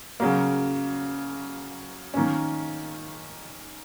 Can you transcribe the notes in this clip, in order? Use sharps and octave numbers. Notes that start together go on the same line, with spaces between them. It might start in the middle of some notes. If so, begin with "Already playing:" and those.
C#3 F#3 A#3
D#3 A#3 C#4